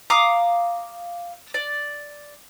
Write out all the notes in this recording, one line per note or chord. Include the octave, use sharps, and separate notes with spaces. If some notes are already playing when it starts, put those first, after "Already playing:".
F5 A#5 D6 D#6
D5